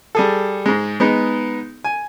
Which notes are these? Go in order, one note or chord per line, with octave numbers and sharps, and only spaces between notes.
G3 G#4 A4
G#2 G#3
G#3 B3 D#4
G#5